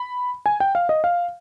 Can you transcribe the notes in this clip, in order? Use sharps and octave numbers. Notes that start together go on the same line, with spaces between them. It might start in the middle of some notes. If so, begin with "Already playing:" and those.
Already playing: B5
G#5
G5
F5
D#5
F5